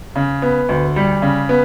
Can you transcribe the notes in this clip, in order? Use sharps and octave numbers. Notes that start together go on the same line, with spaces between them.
C#3
B3
D2
G3
C#3
B3